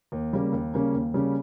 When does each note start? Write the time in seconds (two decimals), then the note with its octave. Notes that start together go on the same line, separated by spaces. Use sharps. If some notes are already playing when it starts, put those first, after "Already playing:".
0.12 D#2
0.33 C#3 G3 A#3 C#4
0.52 D#2
0.74 C#3 G3 A#3 C#4
0.94 D#2
1.14 C#3 G3 A#3 C#4